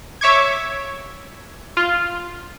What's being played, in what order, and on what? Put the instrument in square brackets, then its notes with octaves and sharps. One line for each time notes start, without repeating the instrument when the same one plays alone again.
[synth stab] C#5 E5 C#6 D6 G#6
F4